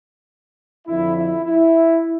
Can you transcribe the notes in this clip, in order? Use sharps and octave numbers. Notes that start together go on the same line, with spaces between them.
F2 D3 F3 E4
E4
E4